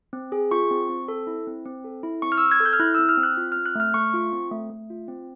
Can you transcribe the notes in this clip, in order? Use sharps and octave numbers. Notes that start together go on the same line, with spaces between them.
C4
G#4
F4 C#6
C4
C4
A4
E4
C4
C4
A4
E4
C4 C#6
F6
E6
C4
G#6
A4
G6
F6
E4 F#6
E6
C4
F6
C4
F#6
F4
F6
C4
F#6
A3 F6
A3 C#6
F4
C4
A3
A3
F4
C4